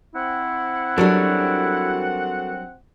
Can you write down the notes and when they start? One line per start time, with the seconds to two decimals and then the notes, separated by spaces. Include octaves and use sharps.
0.15 C4 E4 F#5
0.98 F#3 G3 D4 F#4 A4 A#4